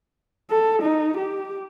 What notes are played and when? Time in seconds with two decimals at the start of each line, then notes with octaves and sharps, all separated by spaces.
0.50 A4
0.82 D#4
1.17 G4